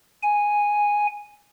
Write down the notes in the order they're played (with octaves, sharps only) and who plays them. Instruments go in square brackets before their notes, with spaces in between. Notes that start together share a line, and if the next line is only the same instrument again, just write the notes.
[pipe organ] G#5